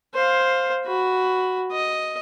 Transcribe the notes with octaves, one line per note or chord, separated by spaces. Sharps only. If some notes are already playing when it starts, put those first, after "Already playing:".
C5 F5
F#4 B5
D#5